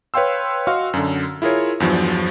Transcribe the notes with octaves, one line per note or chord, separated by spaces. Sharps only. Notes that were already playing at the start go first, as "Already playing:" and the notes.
B4 C#5 F5 G5 C6 E6
F#4 D#5 F5 C6 C#6 F6
F#2 D3
E4 F4 G#4 A#4 C#5
E2 G2 F3 F#3